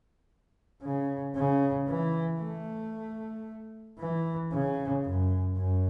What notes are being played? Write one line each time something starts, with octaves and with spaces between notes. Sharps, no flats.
C#3
C#3
E3
A3
E3
C#3
F#2
F#2